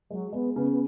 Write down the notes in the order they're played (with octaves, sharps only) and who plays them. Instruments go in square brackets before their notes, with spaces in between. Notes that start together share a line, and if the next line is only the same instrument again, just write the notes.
[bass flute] F#3 [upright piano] G#3
[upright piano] G#3 [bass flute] B3
[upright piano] C#3 [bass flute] B3
[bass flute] B3